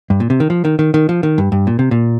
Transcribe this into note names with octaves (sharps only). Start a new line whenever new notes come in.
G2
A#2
C3
D#3
F3
D#3
D#3
D#3
F3
D#3
G2
G2
A#2
C3
A#2